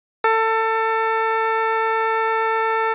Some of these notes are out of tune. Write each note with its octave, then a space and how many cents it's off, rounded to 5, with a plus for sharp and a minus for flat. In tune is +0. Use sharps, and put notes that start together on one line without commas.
A4 +25